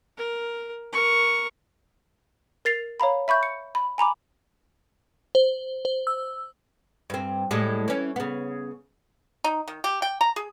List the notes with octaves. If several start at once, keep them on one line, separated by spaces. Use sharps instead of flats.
A#4
A#4 C#6
A#4 A6 C7 F7
C#5 F5 A#5 B5
E5 B5 C#6 G6
C#7
B5
G#5 A#5 B5 D6
C5
C5
E6
G2 C4
A2 G3 G#3
E3 C#4
C#3 B3
D#4
D#3
G4
G5
A#5
G#4